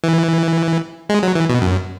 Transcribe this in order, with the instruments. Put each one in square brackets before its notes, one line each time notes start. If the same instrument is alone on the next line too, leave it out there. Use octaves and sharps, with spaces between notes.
[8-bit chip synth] E3
G#3
F#3
E3
B2
F#2